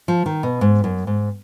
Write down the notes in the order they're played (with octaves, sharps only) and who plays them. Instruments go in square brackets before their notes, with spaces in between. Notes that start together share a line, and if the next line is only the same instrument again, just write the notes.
[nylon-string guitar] F3
D#3
B2
G#2
F#2
G#2